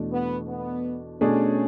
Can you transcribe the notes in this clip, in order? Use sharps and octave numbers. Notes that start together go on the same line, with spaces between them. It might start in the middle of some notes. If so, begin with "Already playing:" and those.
Already playing: E2 B2 A3 D4
B3
B3
B2 A3 C#4 D4 G#4